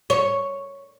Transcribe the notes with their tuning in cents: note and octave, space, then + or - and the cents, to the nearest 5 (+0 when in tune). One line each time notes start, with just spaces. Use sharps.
C#5 +0